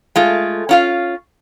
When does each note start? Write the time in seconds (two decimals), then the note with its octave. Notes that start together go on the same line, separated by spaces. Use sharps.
0.16 G#3 A3 F4
0.69 C#4 F4 F5